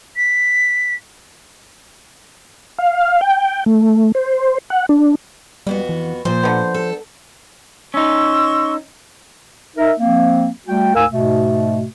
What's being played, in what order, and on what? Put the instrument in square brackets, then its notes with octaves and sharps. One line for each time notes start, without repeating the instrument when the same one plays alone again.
[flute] B6
[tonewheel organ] F5
G5
A3
C5
F#5
D4
[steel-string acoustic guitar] F2 B3 F#4 [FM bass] G3
[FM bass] E3
[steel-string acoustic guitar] A#2 [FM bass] F3 [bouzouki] C5
[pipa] D3 B3
[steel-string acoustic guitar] A4
[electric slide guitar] C#4 D#4 [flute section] C6 C#6 E6
[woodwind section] D#4 A#4 E5
F3 A#3 C4
G3 A3 F#4 G5
D2 G#2 A#4 F5 G#5 E6
G#2 B2 A3